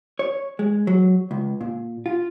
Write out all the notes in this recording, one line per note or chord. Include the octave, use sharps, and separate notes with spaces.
C#5
G#3
F#3
C#2
A#2
F4